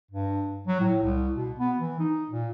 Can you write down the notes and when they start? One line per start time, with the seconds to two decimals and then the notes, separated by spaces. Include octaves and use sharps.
0.11 G2
0.67 F#3
0.81 A2
1.03 C2
1.36 B2
1.59 B3
1.79 E3
2.00 D#4
2.30 A#2